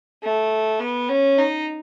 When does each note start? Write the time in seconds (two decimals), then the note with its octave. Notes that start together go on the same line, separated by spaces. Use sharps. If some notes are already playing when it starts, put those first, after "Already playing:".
0.23 A3
0.80 B3
1.09 C#4
1.38 D#4